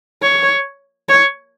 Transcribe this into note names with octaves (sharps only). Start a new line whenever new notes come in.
C#5
C#5